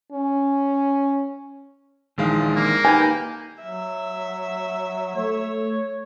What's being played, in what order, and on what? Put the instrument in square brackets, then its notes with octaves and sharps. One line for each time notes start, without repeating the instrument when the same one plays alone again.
[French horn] C#4
[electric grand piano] A#1 G#3 F5 [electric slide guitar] D#3 E3 D4
[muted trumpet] A#3
[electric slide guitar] D#4 G4 [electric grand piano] B4 [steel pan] G#5
[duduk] F#3 [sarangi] E5
[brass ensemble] A3 [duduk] C#5